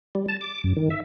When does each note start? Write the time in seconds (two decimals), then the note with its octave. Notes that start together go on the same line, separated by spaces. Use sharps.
0.15 G3
0.28 A5
0.41 D6
0.64 F#2
0.77 D#3
0.90 E5